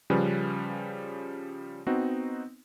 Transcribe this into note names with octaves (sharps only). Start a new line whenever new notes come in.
C#3 F3 G3 C#4 B4
B3 C4 D#4 F#4